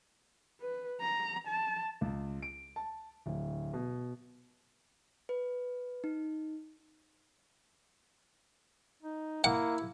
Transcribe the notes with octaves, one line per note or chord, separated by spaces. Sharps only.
B4
A#5
A5
C#2
D7
A5
D1
B2
B4
D#4
D#4
A#3 E4 F#5